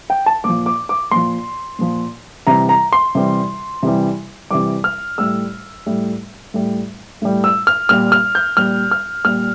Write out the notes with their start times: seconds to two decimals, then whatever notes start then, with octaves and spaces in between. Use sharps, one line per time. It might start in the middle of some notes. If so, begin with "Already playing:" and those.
0.10 G5
0.26 A5
0.44 A#2 F3 D6
0.66 D6
0.89 D6
1.11 A#2 F3 C6
1.79 A#2 F3
2.47 C3 E3 G3 A#5
2.69 A#5
2.93 C6
3.15 C3 E3 G3
3.83 C3 E3 G3
4.51 C3 E3 G3 D6
4.84 F6
5.18 A2 G3 E6
5.86 A2 G3
6.54 A2 G3
7.22 A2 G3
7.44 E6
7.67 F6
7.89 A#2 G3 F6
8.12 F6
8.35 G6
8.57 A#2 G3 F6
8.91 F6
9.25 A#2 G3 F6